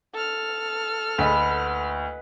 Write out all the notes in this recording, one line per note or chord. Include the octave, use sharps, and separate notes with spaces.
A4 F6
D2 B4 D#5 F#5